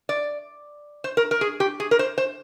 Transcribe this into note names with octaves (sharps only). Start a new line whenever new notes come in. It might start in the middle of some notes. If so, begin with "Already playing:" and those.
D5
C5
A#4
A#4
G#4
G4
G#4
A#4
C5
C5